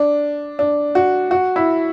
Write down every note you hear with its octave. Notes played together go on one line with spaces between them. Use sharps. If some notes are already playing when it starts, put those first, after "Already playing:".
Already playing: D4
D4
F#4
F#4
E4